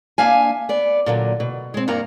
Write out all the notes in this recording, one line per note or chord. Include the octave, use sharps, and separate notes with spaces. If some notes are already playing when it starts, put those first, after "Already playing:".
A#3 D4 E5 F5 G#5
B3 D5
A#2 D3 F#3
B2
G#3 C4
G2 A#3 F#5 A#5